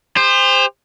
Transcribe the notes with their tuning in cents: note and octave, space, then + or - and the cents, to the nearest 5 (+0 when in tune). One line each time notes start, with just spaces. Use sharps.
G4 +45 C5 +0